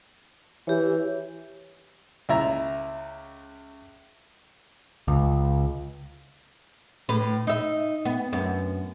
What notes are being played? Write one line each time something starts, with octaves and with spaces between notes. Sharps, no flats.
E3 G4 C#5
C#2 E4 E5 A#5
C#2
A2 B4
D#4 E5
B3
F#2 B3